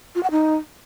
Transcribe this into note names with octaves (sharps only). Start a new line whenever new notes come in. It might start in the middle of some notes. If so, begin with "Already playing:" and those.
F4
F#5
D#4